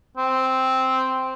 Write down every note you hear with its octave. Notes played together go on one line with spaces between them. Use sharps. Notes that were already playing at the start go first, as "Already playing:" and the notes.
C4